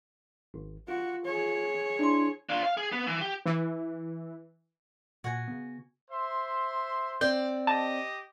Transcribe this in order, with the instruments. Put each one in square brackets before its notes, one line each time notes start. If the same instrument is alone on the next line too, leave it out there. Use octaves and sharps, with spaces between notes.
[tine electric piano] G#1
[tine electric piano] F4 [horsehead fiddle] F#4
[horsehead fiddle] G#4 C#5
[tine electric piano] D4 E4 C6
[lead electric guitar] D4 F4
F5
G#4
B3
E3
G4
[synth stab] E3
[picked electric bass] A#2 [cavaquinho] F#4 G#5
[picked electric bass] C#3 B3
[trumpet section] C5 E5 C6
[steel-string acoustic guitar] C4 D5 G5 [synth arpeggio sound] G6
[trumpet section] G4 D#5 [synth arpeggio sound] A5